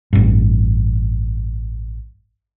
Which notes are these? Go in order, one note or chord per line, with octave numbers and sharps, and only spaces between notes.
A1 G2